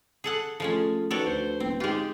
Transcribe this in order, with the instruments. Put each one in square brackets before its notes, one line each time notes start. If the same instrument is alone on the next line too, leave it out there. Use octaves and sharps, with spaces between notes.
[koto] G#4 A4 F#5
[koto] F3 G#3 C#4 [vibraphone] A3 F4 A4
[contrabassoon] D#3 [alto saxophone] F#4 [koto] A4 C#5 D5 [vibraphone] B4
[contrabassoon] D2 [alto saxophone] C5
[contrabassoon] D#1 [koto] C4
[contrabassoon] G#2 [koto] G#3 F4 [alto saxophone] G4